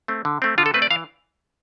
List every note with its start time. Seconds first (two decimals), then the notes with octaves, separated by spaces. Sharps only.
0.08 A3 C4
0.25 D3
0.42 A3 C4
0.58 D3 F4
0.66 A4
0.74 A3 C4 B4
0.82 D5
0.91 E3 F5